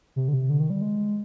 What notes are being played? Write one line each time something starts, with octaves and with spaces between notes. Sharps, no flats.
C3
D3
C3
D3
D#3
G3
G#3